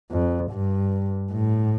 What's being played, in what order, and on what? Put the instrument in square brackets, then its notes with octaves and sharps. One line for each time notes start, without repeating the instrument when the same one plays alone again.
[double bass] F2
G2
A2